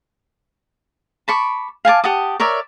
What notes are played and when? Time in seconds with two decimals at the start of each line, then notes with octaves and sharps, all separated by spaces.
1.28 A5 B5 C#6 D6
1.85 F5 G#5 A5 D6
2.04 G4 F#5 A5 D#6
2.40 A#4 C#5 D5 E5